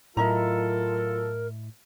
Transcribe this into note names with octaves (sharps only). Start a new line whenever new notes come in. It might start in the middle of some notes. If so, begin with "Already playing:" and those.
A2 F#3 E4 F4 A4 A#4 D#5 A#5